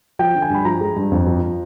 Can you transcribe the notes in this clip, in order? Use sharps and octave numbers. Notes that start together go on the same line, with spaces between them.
F3 G5
D3
G#5
G2 B5
F3 A#5
G#3
G2
F2
F3